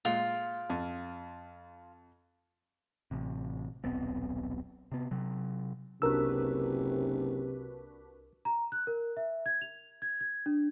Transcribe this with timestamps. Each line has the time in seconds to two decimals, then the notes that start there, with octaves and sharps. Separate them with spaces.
0.05 A#2 G#3 F4
0.70 F2
3.11 A1 C3
3.84 D#1 B1 B3 C4
4.92 C3 B3
5.11 C3 F#3
6.02 F#1 C2 C3 D4 F#4 A#4 B4 E6
8.45 A#5
8.72 F#6
8.87 A#4
9.17 E5
9.46 G#6
9.61 F7
10.02 G#6
10.21 G#6
10.46 D4